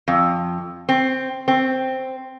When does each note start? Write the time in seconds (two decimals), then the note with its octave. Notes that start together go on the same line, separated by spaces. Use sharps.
0.08 F2
0.89 C4
1.48 C4